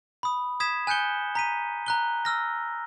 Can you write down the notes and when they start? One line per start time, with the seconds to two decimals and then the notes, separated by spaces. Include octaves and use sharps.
0.23 B5 D#6
0.60 D#6 G#6 B6 E7
0.87 G#5 F#6 G6 C#7 G7
1.35 A#5 B6 D#7
1.86 A#5 F#6 G7
2.25 E6 F6 A#6